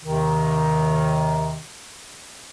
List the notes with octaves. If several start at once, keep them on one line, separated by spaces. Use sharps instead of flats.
D#2 C3 D#3